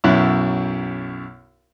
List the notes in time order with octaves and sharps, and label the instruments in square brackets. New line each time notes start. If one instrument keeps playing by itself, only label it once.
[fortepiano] B1 F#2 E4 F#6